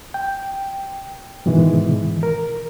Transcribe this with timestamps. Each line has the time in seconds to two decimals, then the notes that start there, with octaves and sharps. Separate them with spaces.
0.14 G5
1.46 G#2 B2 D#3 E3 G#3
2.23 A#4